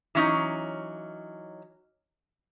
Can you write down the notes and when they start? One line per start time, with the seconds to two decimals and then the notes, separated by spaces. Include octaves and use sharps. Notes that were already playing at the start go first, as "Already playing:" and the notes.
0.15 E3 F#3 C#4 D#4